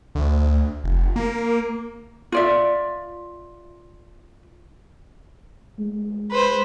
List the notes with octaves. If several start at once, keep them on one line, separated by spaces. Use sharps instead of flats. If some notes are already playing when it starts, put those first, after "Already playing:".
D2
F1
A#3
F4 D5 E5
G#3
B4 C5